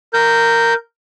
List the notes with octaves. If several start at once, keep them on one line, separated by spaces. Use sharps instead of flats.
A#4 G6